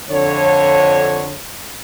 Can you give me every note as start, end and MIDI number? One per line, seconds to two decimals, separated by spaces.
0.10 1.34 41
0.10 1.34 50
0.10 1.34 73